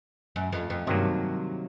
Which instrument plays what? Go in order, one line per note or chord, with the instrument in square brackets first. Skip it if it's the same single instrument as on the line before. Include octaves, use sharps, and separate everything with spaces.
[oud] F#2
F2
F2
[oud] G2 [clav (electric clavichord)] C3 D#3 F#3 A#3